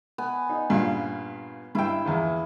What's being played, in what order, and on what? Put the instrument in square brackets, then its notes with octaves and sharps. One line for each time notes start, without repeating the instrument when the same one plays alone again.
[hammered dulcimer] B3 G#5
[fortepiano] D#4
G2 A#2 C#3
[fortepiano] G2 G5 [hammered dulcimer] E4 E5
[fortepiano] A#1 E2